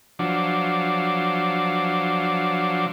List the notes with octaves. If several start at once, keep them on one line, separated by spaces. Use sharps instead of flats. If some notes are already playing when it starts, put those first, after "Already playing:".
F3 F#3 D4